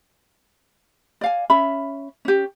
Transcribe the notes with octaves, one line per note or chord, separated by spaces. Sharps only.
D5 F5 G#5
C#4 E5 B5
C#4 G4